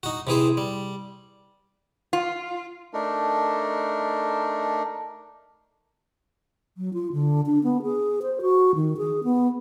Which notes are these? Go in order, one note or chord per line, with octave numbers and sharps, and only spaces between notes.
D#4 F#4
C3 E3 G#4 C5
G3
F4
A3 D4 D#4 A#4
F#3
F4
D3
D4
B3
G#4
C5
F#4
D#3
G#4
B3